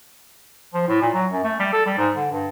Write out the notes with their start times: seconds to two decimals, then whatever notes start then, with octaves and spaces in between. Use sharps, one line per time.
0.74 F3
0.88 A2
1.01 A#2
1.14 F#3
1.32 F#2
1.44 A3
1.59 G3
1.73 A4
1.86 G3
1.98 G#2
2.16 D3
2.32 G2